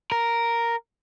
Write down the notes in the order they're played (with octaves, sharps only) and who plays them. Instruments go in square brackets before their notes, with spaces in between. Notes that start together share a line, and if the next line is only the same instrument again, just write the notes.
[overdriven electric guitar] A#4